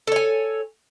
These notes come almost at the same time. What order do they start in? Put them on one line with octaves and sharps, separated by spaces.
A4 C#5 G#5